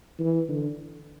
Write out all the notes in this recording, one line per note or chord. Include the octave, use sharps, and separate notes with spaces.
E3
D3